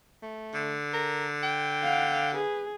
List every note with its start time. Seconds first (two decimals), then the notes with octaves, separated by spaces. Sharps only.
0.22 A3
0.54 D3
0.94 A#4
1.43 G5
1.83 F5 F#5
2.34 G#4 B4